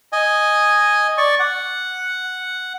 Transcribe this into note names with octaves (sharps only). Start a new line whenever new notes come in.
D#5 G#5
D5 C#6
F#5